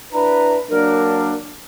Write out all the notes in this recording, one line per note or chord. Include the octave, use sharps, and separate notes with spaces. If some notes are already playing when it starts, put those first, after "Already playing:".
D4 E4 B4 A#5
F#3 A#3 D4 A#4